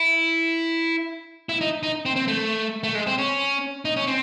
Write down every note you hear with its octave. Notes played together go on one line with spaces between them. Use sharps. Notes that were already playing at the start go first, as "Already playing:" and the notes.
Already playing: E4
E4
D#4
D#4
C4
C4
A3
A3
G#3
C4
C#4
D#4
C#4
C4